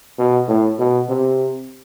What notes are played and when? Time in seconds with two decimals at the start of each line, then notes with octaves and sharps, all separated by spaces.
0.19 B2
0.48 A2
0.79 B2
1.09 C3